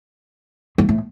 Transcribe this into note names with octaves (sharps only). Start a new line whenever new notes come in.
G2
A2